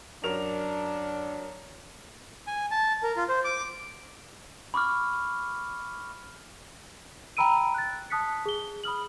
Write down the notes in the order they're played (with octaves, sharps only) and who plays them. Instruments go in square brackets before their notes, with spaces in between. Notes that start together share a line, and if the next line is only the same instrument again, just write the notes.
[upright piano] F#2 A#4 F7 [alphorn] D4
[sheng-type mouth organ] G#5
A5
A#4
F4
C5
D6
[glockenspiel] B5 C#6 D6 F6
[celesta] G5 A#5 B5 E6 D7 D#7
F#6 A6
A5 D#6 F#6 B6 C#7
G#4 G7
B5 D#6 F6 F#7